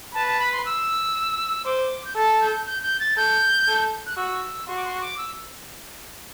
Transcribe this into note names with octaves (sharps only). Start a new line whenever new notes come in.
B4 A5
A5
B5
C6
E6
C5 D6
G6
A4 A6
G6
G6
G6
A6
A4 G6
A4
F#6
F#4 E6
F#4 C6
D6
C6
D6
E6